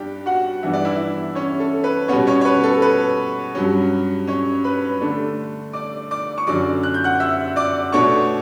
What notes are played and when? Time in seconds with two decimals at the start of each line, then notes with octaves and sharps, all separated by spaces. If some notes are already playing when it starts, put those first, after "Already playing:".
Already playing: G2 D4 G4 D5 G5
0.26 F#4 F#5
0.63 G2 E3 B3 D4 E5
0.73 D5
0.85 E4 E5
1.35 C#4 C#5
1.60 A4
1.84 B4
2.08 B2 G3 B3 C#4 C#5
2.27 C#4 C#5
2.41 C#5
2.45 B4
2.64 A4
2.82 B4
3.55 G2 F#3 C#4
4.27 C#4 C#5
4.64 B4 B5
5.01 D3 A3 D4
5.73 D5 D6
6.11 D5 D6
6.38 C#6
6.47 F#2 D3 F#3 D5 D6
6.83 F#6
6.94 G6
7.04 F#5 F#6
7.20 E5 E6
7.56 D5 D6
7.92 B2 A3 D4 C#5 C#6